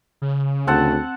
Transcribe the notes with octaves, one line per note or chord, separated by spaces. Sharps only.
C#3
D2 C4 F#5 A5